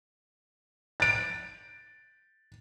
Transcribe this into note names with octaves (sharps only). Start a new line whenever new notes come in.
A6 D7